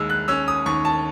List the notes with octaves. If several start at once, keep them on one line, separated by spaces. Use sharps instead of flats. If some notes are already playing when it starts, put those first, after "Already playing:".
Already playing: D#2 G#3 E6
F#6
C#4 E6
D#6
D#2 C#6
A5